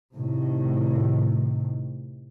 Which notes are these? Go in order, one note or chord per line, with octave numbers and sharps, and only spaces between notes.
A2 C3 D#3